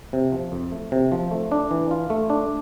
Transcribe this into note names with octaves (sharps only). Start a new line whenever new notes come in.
C3
F3
F2
A3
C3
F3
A3
D4
E3
F4
A3
D4